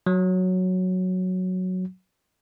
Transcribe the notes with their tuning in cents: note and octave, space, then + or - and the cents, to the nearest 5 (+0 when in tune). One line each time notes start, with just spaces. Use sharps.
F#3 -5